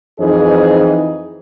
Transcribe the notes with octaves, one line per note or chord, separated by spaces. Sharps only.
F2 E3 D#4 G#4 C5 D#5